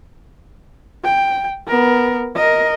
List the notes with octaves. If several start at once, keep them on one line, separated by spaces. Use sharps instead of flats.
G5
B3 A#4
A#4 D#5